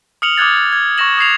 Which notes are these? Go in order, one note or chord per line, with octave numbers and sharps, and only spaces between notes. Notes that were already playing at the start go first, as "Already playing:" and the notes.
D#6 F6 C#7 F7 F#7
D6 D#6 F6 F#6 G#6 A6
F#6
G#6
C#6 D#6 G#6 A#6 E7 F#7
D#6 G#6 C7 F7